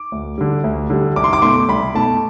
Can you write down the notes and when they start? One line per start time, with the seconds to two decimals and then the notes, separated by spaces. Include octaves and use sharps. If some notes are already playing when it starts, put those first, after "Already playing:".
Already playing: D6
0.12 D2
0.38 D3 G3
0.64 D2
0.90 D3 G3
1.16 C2 D6
1.24 C6
1.33 D6
1.42 B2 A3 C6
1.68 C2 B5
1.95 B2 A3 A5